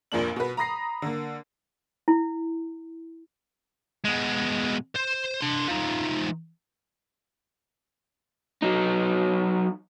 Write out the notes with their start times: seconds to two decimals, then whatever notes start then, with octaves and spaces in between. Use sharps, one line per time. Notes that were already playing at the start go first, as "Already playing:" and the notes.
0.12 F1 A#1 A#2 A#3 D4 F#7
0.36 B2 B4
0.57 A#5 B5 D#6 A#6 C7
1.02 D3 A#3
2.08 E4
4.05 B2 G#3
4.96 C5
5.41 D4 C6
5.68 F3 D#4
8.63 F#3 D#4